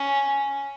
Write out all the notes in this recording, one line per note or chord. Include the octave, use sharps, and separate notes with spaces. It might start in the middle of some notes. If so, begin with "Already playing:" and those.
Already playing: C#4